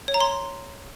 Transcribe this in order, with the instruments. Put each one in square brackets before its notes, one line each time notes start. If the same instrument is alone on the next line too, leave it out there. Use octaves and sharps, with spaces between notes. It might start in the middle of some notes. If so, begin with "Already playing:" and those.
[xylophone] C#5
A#5
C6